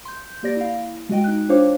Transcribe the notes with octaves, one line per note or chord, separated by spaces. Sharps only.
C6 G6
A#3 G4 D5 A#6
E4 F5
G#3 F#4 D#5 G5
D#4 F#6
D4 F4 C5 C#5 F5 D6